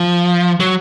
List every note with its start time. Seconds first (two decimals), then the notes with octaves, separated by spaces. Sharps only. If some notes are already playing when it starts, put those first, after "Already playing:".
Already playing: F3
0.60 F#3